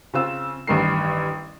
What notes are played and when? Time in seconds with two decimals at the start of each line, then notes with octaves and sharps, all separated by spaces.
0.13 C#3 C4 F4 E6
0.67 A1 G2 D#3 A#4 C7